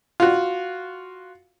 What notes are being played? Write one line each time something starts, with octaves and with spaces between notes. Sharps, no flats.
F4 F#4